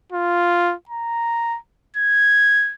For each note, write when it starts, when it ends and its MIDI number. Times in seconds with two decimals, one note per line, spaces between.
0.13 0.74 65
0.89 1.58 82
1.96 2.74 92